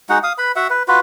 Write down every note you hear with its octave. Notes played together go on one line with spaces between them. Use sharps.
G#3 D#4 F#4 F#5
F5 D#6
B4 B5
F#4 E5 F#5
B4
F4 F#4 B4